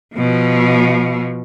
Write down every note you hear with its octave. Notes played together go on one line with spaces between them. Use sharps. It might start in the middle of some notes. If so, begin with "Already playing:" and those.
B2 F3